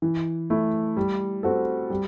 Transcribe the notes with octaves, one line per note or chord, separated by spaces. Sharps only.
E3
A3 E4
G3
C4 F#4 A4
G3